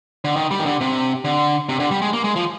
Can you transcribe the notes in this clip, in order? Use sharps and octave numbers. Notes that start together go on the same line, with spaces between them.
D3
D#3
G3
D#3
D3
C3
D3
C3
D3
G3
G#3
A#3
G#3
F3